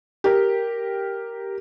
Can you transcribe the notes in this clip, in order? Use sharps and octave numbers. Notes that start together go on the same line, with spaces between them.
G4 A#4